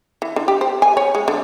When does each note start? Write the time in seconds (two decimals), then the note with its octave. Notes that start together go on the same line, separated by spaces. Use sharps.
0.22 E3
0.36 D3
0.48 G4
0.61 C5
0.82 G#5
0.97 C#5
1.15 G#3
1.28 D3